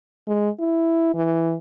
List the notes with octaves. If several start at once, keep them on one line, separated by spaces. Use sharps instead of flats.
G#3
E4
E3